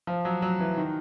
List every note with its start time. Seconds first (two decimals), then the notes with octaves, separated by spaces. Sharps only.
0.07 F3
0.25 F#3
0.42 F#3
0.60 E3
0.77 D#3